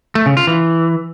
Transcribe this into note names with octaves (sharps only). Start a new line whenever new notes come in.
A3
C#3
F4
E3